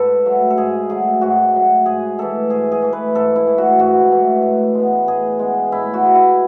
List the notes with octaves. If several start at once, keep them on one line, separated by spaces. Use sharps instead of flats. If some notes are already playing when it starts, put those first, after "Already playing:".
Already playing: G#2 A4 B4
F#3 A3
A4
G#2 G#4
F#3 A3 G#4
G#2 F#4
F#3 A3
G#2 G#4
E3 A3 A4
G#2 G#4
G#4
E3 A3
B4
G#2 A4
E4
E3 A3
F#4
G#2 F#4
E3 A3
A2
G#3 B3
A2 G#4
G#3 B3
A2 E4
F#4
G#3 B3
E4